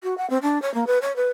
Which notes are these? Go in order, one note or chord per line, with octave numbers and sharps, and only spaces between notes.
F#4
F#5
C4
D4
C#5
A#3
B4
C#5
B4